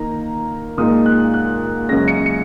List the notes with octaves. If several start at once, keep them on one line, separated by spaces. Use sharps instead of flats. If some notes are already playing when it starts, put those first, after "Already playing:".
Already playing: D#3 A#3 D#4 A#5
A#2 G#3 D#4 D#6
F#6
F#6
F#2 C#3 G#3 C#4 A#6
C#7
C#7